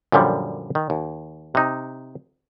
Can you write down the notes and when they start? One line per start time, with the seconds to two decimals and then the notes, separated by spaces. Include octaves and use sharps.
0.12 F#2 A#2 D3 F3 G3
0.75 D#3
0.90 D#2
1.55 C3 D#4